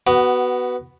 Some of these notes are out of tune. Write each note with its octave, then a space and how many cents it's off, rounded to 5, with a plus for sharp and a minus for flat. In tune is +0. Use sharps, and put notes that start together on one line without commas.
B3 +0 F#4 +20